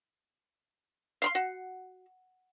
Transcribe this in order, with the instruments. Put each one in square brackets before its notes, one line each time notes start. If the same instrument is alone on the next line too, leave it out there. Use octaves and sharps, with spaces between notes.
[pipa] F5 B5 C6 [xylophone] C7
[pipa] F#4 [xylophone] F#5